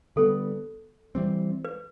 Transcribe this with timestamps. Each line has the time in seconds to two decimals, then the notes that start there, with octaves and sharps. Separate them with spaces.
0.16 D3 G3 B3 A4
1.15 E3 G3 C4
1.65 B4